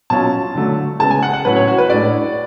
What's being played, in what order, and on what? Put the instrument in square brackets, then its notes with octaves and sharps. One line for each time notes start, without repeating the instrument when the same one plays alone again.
[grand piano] B2 F#3 C#4 F4 A5
D3 F#3 A3
C#3 G#3 B3 A5
G#5
F#5
F#5
A2 F#3 C#4 B4
C#5
F#4
B4
A2 G#3 D4 D5